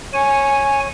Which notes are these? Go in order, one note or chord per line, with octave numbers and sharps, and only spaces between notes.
C#5 G#5